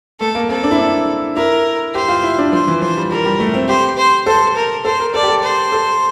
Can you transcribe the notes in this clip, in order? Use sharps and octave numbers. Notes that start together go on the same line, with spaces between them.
A3 A4
A#3
C4 A4
D4
E4
D4
E4 A#4
G4 C5
F4
E4
D4
F3 C5
E3
F3 C5
G3
G3 A#4
G3
A3
C4
G4 C5
C5
A4 C5
A#4
A4 C5
A#4
A4 D5
G4
A4
C5
A4